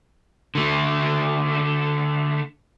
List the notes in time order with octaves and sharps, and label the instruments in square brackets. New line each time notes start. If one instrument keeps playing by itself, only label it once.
[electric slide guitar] D3 A3